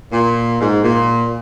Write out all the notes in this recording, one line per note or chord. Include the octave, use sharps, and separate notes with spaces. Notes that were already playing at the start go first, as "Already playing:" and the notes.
A#2
G#2
A#2